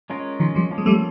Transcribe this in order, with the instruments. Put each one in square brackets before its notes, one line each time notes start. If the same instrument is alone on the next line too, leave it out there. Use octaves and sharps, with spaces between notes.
[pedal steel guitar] G#3 C#4 F4 A#4
[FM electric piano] D#3 F3
F3 G3
[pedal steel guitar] F3 A#3 C#4
[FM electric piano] G#3
G3 A3